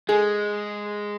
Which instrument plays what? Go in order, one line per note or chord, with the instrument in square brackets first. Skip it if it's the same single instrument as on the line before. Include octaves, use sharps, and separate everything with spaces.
[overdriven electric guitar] G#3 [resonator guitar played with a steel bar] G#4